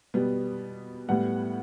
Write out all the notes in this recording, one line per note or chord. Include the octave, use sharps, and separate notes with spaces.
B2 G3 B3
A2 G3 B3 F#5